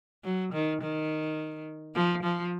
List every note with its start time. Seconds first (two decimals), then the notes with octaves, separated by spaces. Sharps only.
0.24 F#3
0.53 D#3
0.82 D#3
1.95 F3
2.23 F3